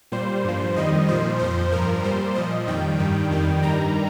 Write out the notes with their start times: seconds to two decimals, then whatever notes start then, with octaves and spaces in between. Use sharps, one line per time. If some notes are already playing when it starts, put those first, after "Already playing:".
0.12 A#2 G3 C5
0.44 G2 F3
0.76 F2 D#3 G3 D#5
1.09 A#2 F3 C5
1.39 F2 F3 C5
1.72 G2 F3 A#4
2.04 A#2 G3 C5
2.35 A#2 F3 D#5
2.67 F2 D#3 G3 G5
2.99 G2 D#3 G3
3.31 F2 D#3 G3
3.63 G2 D#3 G3 A#5